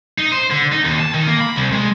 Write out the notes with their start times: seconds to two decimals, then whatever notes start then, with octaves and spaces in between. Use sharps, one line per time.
0.18 D#4
0.32 C5
0.50 D3
0.72 D#4
0.85 D#2
1.00 A5
1.14 D#3
1.27 A#3
1.40 B5
1.56 C2
1.72 G#3